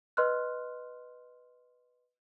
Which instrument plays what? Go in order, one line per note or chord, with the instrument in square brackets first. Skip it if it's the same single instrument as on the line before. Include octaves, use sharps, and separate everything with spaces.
[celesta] B4 D#5 C6 F6 F#6